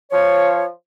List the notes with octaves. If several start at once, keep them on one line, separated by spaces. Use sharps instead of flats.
F3 C#5